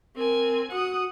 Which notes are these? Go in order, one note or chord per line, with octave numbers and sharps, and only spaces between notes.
C4 A#4 G#5
F#4 F#5 D#6